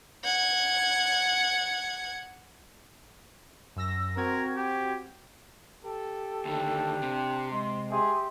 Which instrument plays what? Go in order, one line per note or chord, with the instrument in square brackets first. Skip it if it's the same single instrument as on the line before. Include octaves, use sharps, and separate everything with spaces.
[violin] F#5 G#6
[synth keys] F#2 E6 A#6
[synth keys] C4 F#4 G#6 [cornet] A#4
[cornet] G4
[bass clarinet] G4 [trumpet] A4
[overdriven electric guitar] D2 D#3 [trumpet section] D4 G5
[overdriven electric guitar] C3
[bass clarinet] G#3 [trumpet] C6
[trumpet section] G4 E5 C6 [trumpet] G#4